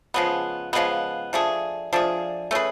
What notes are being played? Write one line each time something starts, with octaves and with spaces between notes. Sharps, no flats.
C#3 F3 G#3 B3
C#3 F3 G#3 B3
F3 A3 D4 G#4
F3 A3 D4 G#4
A3 C#4 G#4 B4